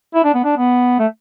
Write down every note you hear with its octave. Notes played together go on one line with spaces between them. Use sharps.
E4
D4
B3
D4
B3
A3